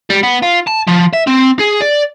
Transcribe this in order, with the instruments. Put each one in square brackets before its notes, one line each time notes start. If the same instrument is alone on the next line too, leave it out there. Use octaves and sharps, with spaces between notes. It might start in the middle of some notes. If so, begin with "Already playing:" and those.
[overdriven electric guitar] G3
B3
F4
A5
F3
E5
C4
G#4
D5